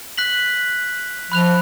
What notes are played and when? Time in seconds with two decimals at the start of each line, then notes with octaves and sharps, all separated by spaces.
0.18 F#6 B6 F#7
1.32 F3 B5 F#6 F7